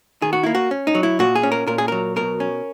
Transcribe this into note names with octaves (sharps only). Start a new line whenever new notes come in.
D#3 G#4
F#4
A#3 E4
F#4
C#4
D#4
F#3
E4
A#2 F#4
G#4
C#4
A#4
A#2 A#4
G#4
F#3 A#4
B2 A#4
C#4